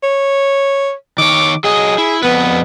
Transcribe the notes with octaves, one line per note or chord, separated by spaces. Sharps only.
C#5
D#3 C#5 D6
F#3 G#4 D#5
E4
F2 D#3 B3 B4